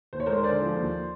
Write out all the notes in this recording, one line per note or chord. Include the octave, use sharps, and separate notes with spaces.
D#2 C5
C#5
G#3 A#4 C5
D3 C5 D5
F3
D#2